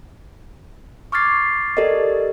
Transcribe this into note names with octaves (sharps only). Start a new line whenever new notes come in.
C#6 D6 F6 G#6 A6 C7
G4 A4 A#4 D5 D#5